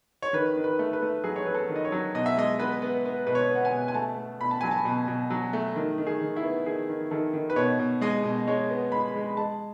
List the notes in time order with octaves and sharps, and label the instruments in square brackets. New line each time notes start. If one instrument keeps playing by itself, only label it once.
[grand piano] C#5
D#3 B4
D#3
B4
A3
B4
A3
F#3 G#4
C#5
F#3 B4
A4
D#3
D#5
C#5
F#3
B2 D#5
E5
G#3 D#5
B3 B4
B3
B3
B2 B4
C#5
B3
F#5
G#5
B2
G#5
A3 A5
A3
B2 B5
A5
F#3 G#5
A5
B2
B2
F#3
A3
D#3
D#3
G#4
D#3
E4
B3
D#3 G#4
D#3
D#3 A4
D#3
B4
B2 C#5
B2
G#3 D#5
B2
G#3 C#5
B3
G#3 B5
G#3
G#3 A5